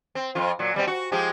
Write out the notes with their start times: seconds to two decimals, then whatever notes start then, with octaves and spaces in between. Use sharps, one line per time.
0.15 C4
0.35 F2 F4
0.59 A#2 F#3
0.74 B2 G3 C4
0.87 F#4
1.12 F3 G#3 G4